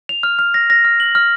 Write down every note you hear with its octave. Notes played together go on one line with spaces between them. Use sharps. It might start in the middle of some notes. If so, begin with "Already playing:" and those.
F7
F6
F6
A#6
A#6
F6
F#7
F6